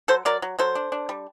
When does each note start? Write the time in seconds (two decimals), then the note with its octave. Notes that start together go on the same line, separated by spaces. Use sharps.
0.08 F#3 A4 C5
0.25 F#3 A#4 D5
0.42 F#3
0.59 F#3 A4 C5
0.75 D4
0.92 D4
1.09 G3